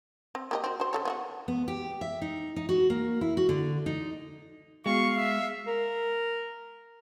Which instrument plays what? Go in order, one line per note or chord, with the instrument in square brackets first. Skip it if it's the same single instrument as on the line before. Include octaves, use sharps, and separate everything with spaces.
[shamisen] C4
A#3 G4 D#5
C4 F#4
F#4 C5
C#3 A4 C#5
B3 F4 F#4
[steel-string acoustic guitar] B3
G4
E5
D#4
D#4
F#4
A#3
E4
F#4
D3
D#4
[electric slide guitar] G#3 [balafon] B3 F#4 [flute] F5 [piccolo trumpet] C#6
[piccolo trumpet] E5
[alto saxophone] A#4